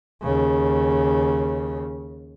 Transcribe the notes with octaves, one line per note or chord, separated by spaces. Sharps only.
D#2 C#3